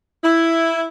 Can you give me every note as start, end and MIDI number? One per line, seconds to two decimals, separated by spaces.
0.24 0.84 64